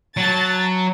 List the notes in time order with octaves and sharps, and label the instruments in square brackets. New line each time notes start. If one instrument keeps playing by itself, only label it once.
[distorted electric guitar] F#3 [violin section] A5 A6